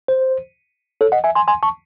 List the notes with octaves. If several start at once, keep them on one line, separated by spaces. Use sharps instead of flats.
C5
A4 C#5
D#5 F#5
E5 G#5
G#5 C6
G#5 C6
A5 C#6